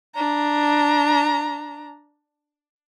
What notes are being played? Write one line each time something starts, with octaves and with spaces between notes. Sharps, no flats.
D4 A#5